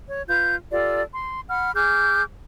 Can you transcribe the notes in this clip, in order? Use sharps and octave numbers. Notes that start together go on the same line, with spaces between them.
C#5
F4 B4 G6
F4 G4 A4 D5
C6
F#5 B5 F6
G#4 D6 F6 G6